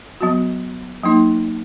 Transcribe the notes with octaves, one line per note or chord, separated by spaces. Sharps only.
F#3 B3 F#4
F#3 A#3 D#4